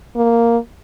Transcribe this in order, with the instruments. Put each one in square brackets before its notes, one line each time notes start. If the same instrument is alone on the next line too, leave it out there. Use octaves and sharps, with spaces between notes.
[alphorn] A#3